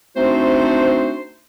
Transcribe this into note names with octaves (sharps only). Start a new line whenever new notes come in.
A3 C4 D4 D#4 F#4 C5